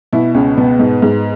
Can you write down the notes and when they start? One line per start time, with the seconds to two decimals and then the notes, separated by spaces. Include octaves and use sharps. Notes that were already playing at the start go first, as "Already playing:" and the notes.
0.13 B2 E4
0.34 C#2 C#4
0.57 B2 B3
0.79 G#2
1.02 G#2